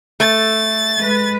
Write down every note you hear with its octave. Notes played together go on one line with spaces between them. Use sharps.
A3 A6
G#3 B4